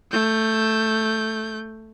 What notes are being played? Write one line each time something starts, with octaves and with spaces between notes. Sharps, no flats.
A3 G6